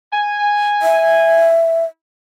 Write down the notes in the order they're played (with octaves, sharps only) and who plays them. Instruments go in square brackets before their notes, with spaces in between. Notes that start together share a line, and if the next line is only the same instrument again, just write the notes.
[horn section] G#5
[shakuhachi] E5